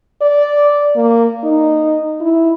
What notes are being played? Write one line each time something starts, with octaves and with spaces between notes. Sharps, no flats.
D5
A#3
D#4
E4